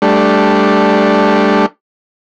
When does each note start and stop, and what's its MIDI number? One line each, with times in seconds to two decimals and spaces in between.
0.02 1.66 55
0.02 1.66 57
0.02 1.66 62